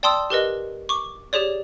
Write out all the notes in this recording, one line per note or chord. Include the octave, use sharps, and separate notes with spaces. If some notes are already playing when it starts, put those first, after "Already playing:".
D5 G5 A5 C6 D#6 E6
G4 A#4 B4 D#5
C#6 D6
G4 G#4 C#5 D5